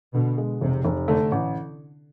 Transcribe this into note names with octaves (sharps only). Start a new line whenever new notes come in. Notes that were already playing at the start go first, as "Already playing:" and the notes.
B2 D3
G#3
F1 C3
F1
D3 A3
A1